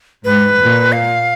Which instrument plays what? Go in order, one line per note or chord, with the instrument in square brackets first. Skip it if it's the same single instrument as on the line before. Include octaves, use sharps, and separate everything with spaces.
[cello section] G#2 [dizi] B4
[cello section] A#2
[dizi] F5